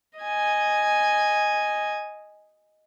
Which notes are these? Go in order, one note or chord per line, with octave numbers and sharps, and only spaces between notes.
D#5 G#5